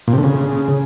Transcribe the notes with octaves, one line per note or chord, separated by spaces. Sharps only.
A#2
C3
D3
C#3